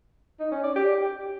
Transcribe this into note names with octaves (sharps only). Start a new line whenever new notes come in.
D#4
C#4
D5
G4